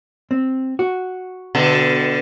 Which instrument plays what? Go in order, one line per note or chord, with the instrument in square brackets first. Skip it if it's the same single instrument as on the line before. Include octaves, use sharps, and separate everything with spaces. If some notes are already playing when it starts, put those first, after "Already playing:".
[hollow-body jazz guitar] C4
F#4
[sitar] B2 D3 A4